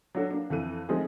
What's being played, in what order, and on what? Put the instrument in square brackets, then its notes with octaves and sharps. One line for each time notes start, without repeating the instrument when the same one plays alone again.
[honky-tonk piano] F#3 D4 F#4 A4
A#3 D4
F2 E3 A4 D#7
F3 G#3 A3 C4 D#4 G#4